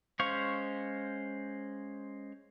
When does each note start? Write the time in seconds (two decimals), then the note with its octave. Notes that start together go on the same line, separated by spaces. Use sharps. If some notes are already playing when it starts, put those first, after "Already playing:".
0.19 G#3 C#4 C5 F5 C#6